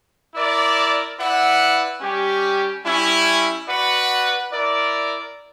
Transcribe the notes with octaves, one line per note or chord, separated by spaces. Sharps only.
E4 A#4 D5
E4 B4 D5 F#5
G3 C#4 G4
G3 C#4 E4
F#4 B4 D5 F#5
E4 A#4 D5